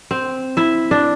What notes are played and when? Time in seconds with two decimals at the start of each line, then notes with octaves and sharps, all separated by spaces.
0.11 C4
0.57 E4 E5
0.91 D4